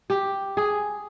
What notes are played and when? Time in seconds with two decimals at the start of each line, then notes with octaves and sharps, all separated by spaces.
0.10 G4
0.57 G#4